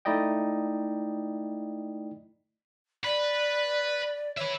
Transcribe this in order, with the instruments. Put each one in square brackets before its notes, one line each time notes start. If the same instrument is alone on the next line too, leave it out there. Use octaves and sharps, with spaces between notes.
[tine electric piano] A3 D#4 E4 D5 D#5 G5
[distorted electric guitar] B4 [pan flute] D5
[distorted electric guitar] B4 E5 [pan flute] C#5